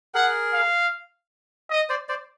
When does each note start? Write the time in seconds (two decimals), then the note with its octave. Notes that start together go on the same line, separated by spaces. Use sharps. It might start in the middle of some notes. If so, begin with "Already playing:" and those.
0.14 G#4 A#4 F#5
0.53 F5
1.70 D#5
1.89 C5 D5
2.09 C5 D5